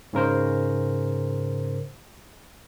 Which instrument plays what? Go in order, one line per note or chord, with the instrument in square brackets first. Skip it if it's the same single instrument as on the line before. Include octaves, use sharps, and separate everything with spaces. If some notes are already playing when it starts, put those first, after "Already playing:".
[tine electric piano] G#2 C#3 A#4 C5